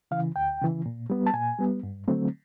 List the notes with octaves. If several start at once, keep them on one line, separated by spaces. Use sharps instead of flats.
C#3 E3 F5
D2 G5
C#3 E3
A#2
G3 B3
A5
A#2 G#5
G3 B3
G2
D3 F#3 A3 C4